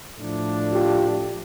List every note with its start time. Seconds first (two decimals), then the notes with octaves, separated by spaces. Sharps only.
0.18 A2 F3 A3 D4
0.73 F4 G4